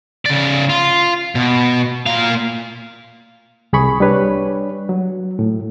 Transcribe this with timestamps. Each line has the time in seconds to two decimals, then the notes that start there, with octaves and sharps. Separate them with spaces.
0.25 C#3 D5
0.69 F4
1.35 B2
2.06 A#2 F5
3.73 C2 G#4 B5 C#6
4.00 G3 D4 B4 C#5
4.89 F#3
5.39 A2